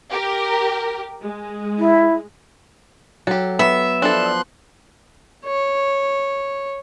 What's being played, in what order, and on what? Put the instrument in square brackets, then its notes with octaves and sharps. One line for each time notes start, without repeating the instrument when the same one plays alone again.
[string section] G4 A#4
G#3
[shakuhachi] E4
[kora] F#3 [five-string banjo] G4 A4
[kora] B3 [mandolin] E5
[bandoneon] F3 C6 F#6 [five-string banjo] D4 E4 A4
[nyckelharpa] C#5